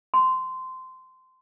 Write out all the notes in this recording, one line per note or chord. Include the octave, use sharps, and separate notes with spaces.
C6